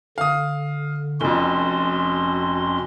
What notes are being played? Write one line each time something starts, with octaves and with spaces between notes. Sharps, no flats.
D3 F5 D#6
F1 F2 C#4 F#4 C6